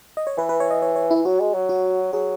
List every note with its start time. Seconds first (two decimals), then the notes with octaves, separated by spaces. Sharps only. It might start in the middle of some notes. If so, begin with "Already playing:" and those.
0.17 D#5
0.27 C#5
0.37 E3 B4
0.49 B4
0.60 C#5
0.71 D#5
0.82 C#5
0.96 C#5
1.11 E3 E4
1.25 F#3 F#4
1.40 G#3
1.54 F#3
1.69 F#4
2.13 F#3 G#4